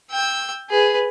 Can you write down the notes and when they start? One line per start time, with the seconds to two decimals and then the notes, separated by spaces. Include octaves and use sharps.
0.11 G5 E6
0.70 G#4 B4